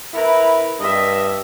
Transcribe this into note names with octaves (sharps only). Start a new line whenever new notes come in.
E4 A#4 B4
G2 D#5 E5